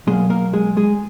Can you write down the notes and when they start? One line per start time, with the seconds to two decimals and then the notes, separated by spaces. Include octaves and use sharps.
0.07 B2 G#3 G#4
0.10 F#3 A#3
0.30 A#3 A#4
0.53 G#3 G#4
0.77 G#3 G#4